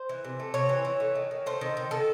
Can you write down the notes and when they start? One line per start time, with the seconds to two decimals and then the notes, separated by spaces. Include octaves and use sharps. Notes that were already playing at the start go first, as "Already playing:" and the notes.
Already playing: C5
0.09 E3
0.24 C3
0.39 A3
0.54 C3 C#5
0.69 E3
0.85 E3
1.00 A3
1.15 D#3
1.31 D#3
1.46 A3 C5
1.61 D#3
1.77 D#3
1.91 D#3 A4